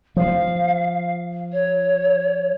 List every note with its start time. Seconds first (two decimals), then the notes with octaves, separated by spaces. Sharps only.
0.16 F3 F5
1.53 C#5